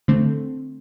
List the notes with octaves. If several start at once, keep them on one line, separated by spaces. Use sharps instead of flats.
D3 A3 C4